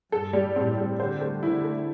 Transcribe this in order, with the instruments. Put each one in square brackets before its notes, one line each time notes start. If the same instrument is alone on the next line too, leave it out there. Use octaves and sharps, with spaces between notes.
[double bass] G2 [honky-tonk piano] A4
[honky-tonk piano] G3
[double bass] A2 [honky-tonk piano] C4
[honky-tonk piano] G3
[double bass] D3 [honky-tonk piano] C5
[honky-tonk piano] A3
[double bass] D3 [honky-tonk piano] E4
[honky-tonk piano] A3